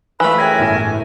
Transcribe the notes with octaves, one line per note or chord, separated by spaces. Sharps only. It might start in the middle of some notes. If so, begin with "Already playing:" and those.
E3 F3 A3 B4 B5
F#2 G#4 A#4 G5 G#5
G1 A2 E7